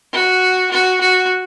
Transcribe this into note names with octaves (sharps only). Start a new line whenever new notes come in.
F#4
F#4
F#4